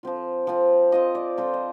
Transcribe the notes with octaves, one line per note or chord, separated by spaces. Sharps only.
F3 C4 F4
F3 C4 F4
F3 C4 F4 D#5
D5
F3 C4 F4 C5
D#5